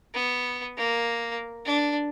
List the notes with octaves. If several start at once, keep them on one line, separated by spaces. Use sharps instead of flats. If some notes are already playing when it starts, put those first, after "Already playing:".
B3
A#3
D4